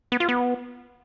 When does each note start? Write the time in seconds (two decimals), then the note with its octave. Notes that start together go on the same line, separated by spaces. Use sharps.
0.12 B3
0.20 F4
0.29 B3